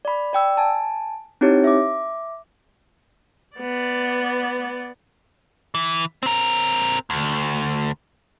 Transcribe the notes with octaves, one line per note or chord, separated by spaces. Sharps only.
D5 B5
D5 G5 E6
G#5 A5
C4 D#4 E4 G4 C#5
E5 D6
B3 D5
E3
C4 A#4
D2